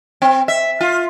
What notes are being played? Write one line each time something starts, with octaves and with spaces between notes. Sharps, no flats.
C4
E5
F4